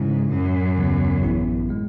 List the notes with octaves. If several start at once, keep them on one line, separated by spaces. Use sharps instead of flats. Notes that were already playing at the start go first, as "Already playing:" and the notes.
Already playing: G#2 C#3 E3 G#3 C#4 E4
F#2 A2 F#3 C#4
D#2 C#3 E3 B3
A1 A2 E3 B3 E4
A2 G#3